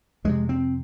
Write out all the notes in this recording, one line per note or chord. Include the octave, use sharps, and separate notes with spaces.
F2 C3 G#3
C4